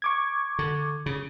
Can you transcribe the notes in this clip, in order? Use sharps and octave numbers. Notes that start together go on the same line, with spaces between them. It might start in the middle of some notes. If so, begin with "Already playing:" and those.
C#6 D6 G#6
D3
C#3